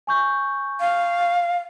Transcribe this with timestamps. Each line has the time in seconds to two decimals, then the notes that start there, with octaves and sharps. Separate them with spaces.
0.07 G#5 C#6 G6
0.80 F5